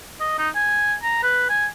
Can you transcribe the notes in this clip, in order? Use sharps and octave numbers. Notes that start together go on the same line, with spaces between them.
D#5
D#4
G#5
A#5
B4
G#5